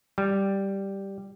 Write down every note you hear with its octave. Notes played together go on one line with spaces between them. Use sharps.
G3